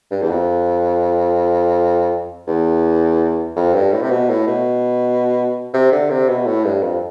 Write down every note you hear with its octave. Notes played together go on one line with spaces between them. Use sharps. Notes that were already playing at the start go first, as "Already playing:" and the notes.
G2
E2
F2
E2
F2
G2
A2
C3
B2
A2
B2
C3
D3
C3
B2
A2
G2
F2